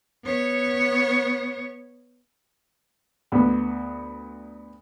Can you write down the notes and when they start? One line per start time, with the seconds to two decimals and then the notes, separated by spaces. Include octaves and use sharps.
0.24 B3 C#5
3.32 D2 B3